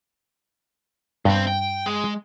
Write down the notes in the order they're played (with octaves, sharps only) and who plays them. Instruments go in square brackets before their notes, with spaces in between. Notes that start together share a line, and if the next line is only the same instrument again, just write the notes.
[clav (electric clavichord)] G2 [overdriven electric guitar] B2 C4
[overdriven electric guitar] G5
G#3